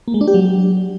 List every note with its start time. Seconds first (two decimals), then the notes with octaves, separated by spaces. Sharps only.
0.08 A#3
0.14 G#3
0.21 D4
0.28 G4
0.34 F#3